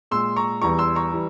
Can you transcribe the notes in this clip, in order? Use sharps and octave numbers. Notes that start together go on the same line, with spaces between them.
A#2 G#3 C6 E6
A#5 C#6
E2 E3 G3 A#5 C#6
C6 E6
A#5 C#6
E3 G3